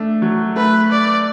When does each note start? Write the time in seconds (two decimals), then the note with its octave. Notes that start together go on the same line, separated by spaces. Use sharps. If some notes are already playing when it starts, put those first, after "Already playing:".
Already playing: A3 D4
0.22 F#3
0.56 A3 B4
0.91 D5